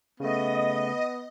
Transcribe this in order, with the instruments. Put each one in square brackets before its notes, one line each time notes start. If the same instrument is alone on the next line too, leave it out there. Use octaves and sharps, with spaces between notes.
[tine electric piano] C#3 A3 [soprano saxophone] B3 [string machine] D#5